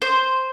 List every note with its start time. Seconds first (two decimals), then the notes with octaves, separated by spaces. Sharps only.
0.02 C5